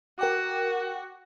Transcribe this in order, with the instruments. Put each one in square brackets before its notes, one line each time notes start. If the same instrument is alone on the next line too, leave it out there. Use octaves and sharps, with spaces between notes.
[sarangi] F#4 [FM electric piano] A#4 G5 D6